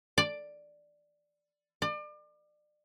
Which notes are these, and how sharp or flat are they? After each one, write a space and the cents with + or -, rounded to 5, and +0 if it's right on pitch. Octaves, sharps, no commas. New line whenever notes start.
D5 +5
D5 +35